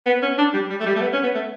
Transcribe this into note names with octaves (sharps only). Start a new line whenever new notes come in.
B3
C#4
D4
G3
G3
A3
G3
A3
B3
C#4
B3
A3